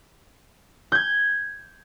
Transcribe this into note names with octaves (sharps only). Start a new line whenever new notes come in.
G6 G#6